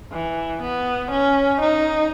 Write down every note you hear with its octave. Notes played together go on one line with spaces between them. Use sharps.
E3
B3
C#4
D#4